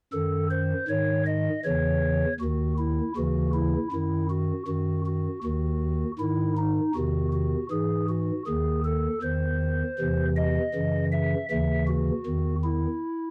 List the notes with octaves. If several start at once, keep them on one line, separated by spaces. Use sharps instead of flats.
F#2 D#3 A4
C5
G#2 D#3 C#5
D#5
E2 C#3 E3 C#5
D#2 D#3 F#4
E4
D#2 C#3 E3 F#4
E4
F#2 D#3 E4
F#4
F#2 D#3 F#4
F#4
D#2 D#3 F#4
G#2 D#3 E4
D#4
E2 C3 D#3 F#4
F#4
G#2 E3 G#4
F#4
D#2 D#3 G#4
A4
E2 D#3 C5
E2 C3 E3
D#5
F#2 C#3 E3
E5
D#2 C#3 E3 E5
F#4
E2 D#3
E4